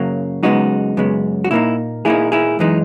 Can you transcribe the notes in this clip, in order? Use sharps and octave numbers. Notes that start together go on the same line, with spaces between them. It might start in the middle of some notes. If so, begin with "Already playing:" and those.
Already playing: F#2 C#3 F#3 A#3
F#2 C#3 G#3 B3 D#4 F#4
F#2 C#3 G#3 B3
F#4
A#2 A#3 D#4 E4
A#2 A#3 D#4 E4 G#4
E4 G#4
F#2 E3 G#3 D#4